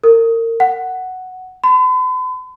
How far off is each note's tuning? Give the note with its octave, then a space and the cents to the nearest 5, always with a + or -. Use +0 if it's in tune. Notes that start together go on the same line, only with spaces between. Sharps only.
A#4 -30
F#5 +5
B5 +45